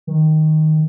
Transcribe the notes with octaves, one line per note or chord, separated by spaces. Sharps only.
D#3